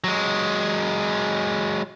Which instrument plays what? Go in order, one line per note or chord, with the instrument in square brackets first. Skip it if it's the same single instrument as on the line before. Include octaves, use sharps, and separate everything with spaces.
[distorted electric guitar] F#3 G#3